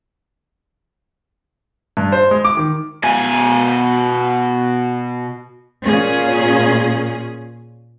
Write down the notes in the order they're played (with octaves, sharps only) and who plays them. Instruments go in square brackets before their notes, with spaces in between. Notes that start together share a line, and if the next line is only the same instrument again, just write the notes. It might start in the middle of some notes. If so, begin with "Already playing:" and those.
[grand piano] G2
C5
G#3
D6
D#3
[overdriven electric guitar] B2 G#5
[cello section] A#2 C#4 G#4